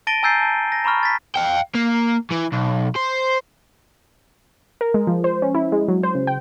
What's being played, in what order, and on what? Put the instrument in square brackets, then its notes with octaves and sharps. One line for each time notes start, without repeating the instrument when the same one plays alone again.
[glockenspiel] A5 A6 A#6 D7 D#7 G7
G#5 A#5 E6 G6 A6 C7
A5
A#6
A#5 B5 C#6 F6
A6 B6
[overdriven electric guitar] F5 G5
A#3
E3
B1
C5
[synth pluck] A#4
G#3
F3
C5
C#4
E4
G#3
F#3
C5
C#3
G5